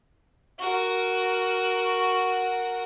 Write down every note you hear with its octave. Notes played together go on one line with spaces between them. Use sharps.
F#4 A#4